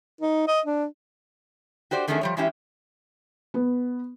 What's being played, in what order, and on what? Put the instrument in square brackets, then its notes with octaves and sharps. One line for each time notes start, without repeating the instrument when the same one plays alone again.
[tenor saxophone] D#4
D#5
D4
[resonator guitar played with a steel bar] F#4 G4 C5 D5
E2 D#3 A3 C#4 D4 G#4
F3 G3 C#5
E3 G#3 C#4 E4 G4
[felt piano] B3